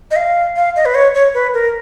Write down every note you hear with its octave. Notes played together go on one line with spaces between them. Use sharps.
D#5
F5
F5
D#5
B4
C#5
C#5
B4
A#4